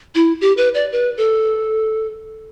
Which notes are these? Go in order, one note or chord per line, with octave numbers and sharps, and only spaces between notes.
E4
G4
B4
D5
B4
A4